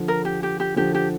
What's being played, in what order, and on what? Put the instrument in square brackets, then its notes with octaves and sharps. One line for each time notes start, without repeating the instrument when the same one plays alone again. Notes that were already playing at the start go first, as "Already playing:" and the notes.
Already playing: [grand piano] D3 F3
[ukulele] A#4
G4
G4
G4
[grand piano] D3 F3 [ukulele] G4
[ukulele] G4